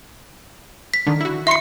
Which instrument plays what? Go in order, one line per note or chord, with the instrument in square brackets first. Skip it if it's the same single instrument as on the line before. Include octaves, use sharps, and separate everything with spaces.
[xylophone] B6
[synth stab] D3 D#3
E4 F#4
[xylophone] E5 C#7 [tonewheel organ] C6